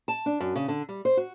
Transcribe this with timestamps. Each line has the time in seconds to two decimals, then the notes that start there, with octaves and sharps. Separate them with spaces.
0.08 A5
0.26 D4
0.40 F#2
0.55 C#3
0.68 D3
0.89 G3
1.05 C5
1.17 F#4